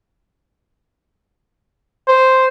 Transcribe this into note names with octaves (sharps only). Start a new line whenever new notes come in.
C5